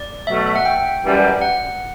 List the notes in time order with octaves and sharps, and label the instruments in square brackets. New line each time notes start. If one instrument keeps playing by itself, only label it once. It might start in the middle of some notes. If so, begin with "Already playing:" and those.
Already playing: [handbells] D5
[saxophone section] B2 F#3 A3 [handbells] E5
[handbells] E5
F#5
G5
[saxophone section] F#2 E3 G3
[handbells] F#5